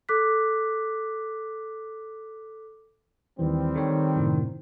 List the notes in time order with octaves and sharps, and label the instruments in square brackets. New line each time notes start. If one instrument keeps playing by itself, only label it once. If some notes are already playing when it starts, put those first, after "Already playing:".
[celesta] A4 D6 F#6 B6
[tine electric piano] D#2 D#3 E3 [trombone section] G3 C4
[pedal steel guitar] D#3 [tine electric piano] A4 C#5
[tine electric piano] F#2 A2 C3